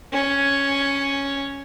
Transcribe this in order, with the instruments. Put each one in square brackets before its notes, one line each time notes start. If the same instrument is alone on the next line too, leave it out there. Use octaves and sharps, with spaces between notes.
[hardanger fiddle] C#4